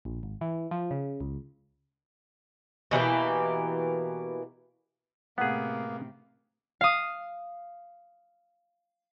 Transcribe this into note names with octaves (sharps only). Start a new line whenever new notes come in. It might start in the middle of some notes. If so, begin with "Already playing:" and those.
A#1
G#1
E3
F3
C#3
C#2
B2 E3 A#3 G4
A2 C3 A#3 B3 G#4 F5 F#5
F5 D#6